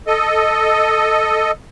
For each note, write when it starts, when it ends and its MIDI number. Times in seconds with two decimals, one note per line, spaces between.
0.07 1.51 69
0.07 1.51 75